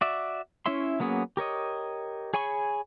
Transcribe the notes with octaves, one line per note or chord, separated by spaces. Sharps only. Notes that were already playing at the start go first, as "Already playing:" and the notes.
F#4 D5 E5
C#4 E4 C#5 E5 C6
F#3 A#3 B3 C#4 G#4
G4 A#4 C#5 D#5
G#4 C#5 G#5 B5 C#6